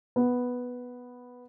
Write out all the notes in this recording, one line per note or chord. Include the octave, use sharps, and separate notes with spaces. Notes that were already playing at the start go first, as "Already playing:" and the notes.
B3